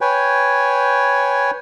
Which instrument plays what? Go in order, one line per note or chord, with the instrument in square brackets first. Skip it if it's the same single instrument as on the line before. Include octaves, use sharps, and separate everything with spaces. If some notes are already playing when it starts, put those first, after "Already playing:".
[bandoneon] B4 C#5 G5 G#5